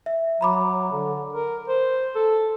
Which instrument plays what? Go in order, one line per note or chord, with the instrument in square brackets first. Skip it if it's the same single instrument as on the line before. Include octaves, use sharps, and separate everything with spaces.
[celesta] E5
[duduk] F#3 [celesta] A#5 B5 D6
[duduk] D3
A#4
C5
A4